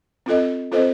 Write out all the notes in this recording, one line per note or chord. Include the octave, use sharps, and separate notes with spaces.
C4 F4 A4 D#5
C4 F4 A4 C5 D#5